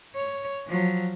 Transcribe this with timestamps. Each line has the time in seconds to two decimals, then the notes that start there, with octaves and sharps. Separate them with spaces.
0.15 C#5
0.67 F3 F#3